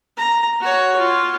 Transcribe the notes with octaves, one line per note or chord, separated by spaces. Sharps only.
A#5
F#4 C#5
F4